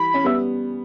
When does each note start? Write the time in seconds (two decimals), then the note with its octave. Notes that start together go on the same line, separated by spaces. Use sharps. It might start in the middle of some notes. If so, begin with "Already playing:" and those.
Already playing: E3 G3 B5
0.14 C#4
0.24 G3 B3 E5